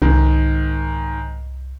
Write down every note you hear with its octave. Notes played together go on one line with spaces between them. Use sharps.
C2 G#2 D#3